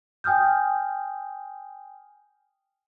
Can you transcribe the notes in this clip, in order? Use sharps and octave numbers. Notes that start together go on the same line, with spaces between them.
G5 G#5 D#6 F6 G6